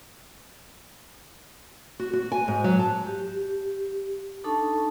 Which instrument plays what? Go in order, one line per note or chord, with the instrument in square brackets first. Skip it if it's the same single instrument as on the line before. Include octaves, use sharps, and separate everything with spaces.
[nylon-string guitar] F#4
F#4
G#5
G#2
F#3
A5
[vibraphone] G4
D4 D#4 A4 A5 C#6